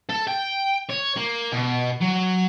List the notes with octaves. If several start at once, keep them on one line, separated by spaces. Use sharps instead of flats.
A4
G5
C#5
A#3
B2
F#3